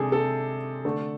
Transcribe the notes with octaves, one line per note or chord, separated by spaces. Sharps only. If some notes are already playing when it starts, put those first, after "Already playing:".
Already playing: C3 G#3 D4 G#4 A4
A4
D3 A3 D4